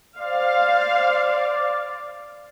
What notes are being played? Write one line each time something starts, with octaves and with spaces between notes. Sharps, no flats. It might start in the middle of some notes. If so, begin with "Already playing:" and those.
C5 D5 F5